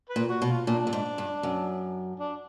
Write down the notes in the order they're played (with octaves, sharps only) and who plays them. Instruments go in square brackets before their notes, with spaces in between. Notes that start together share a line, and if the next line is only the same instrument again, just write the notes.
[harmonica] B4
[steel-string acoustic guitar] A#2
[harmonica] F#4
[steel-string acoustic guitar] B2
[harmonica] F4
[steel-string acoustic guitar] A#2 [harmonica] D4
[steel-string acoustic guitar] G2
G#2
G2
F#2
[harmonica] D4